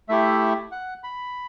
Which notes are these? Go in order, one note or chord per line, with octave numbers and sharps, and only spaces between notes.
A3 E4 G4 E5
F#5
B5